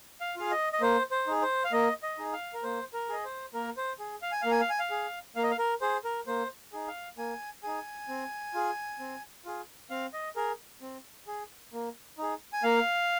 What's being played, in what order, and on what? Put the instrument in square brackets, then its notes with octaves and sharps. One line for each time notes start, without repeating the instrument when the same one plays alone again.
[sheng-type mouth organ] F5
F4 G#4 F5
D#5
D#5
A#3 C5
C5
D#4 G#4
C5
F5
A#3 D#5
D#5
D#4 G#4
F5
A#4
A#3 C5
A#4
G#4 D#5
C5
A#3 A#4
C5
G#4
F5
G#5
A#3 F5
G#5
F5
G#5
F5
G#4
A#3 F5
D#5
F5
A#4
G#4 C5
A#4
A#3 C5
D#4 G#4
F5
A#3 G#5
D#4 G#4 G#5
C4
F4 G#4
C4
F4 G#4
C4 F5
D#5
G#4 A#4
C4
G#4
A#3
D#4 G#4
G#5
A#3 F5